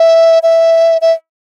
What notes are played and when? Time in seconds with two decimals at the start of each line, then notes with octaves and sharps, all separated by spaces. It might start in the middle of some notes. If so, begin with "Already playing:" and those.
Already playing: E5
0.43 E5
1.01 E5